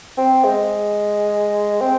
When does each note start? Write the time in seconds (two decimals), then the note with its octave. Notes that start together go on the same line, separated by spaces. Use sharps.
0.17 C4
0.44 G#3
1.81 C4